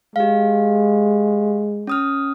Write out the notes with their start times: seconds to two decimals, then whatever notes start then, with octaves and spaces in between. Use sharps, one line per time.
0.16 G#3 G4 F5
1.87 C#4 D#6 F6